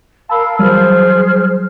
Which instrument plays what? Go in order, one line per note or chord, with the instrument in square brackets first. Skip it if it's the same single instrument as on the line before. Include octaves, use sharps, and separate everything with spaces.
[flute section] A#4 F5 E6 [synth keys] A5 B5
[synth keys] E3 F#3 G3 [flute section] G#4 C5 F6